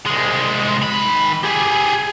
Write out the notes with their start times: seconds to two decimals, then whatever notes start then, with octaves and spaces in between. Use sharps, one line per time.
0.06 C2 G#3
0.82 D#3 B5
1.44 G4 G#4